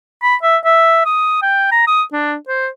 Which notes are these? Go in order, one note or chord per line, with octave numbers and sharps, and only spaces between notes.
B5
E5
E5
D#6
G5
A#5
D#6
D4
C5